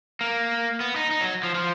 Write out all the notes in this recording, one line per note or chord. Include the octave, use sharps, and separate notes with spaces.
A#3
B3
D#4
D#4
F#3
F3
F3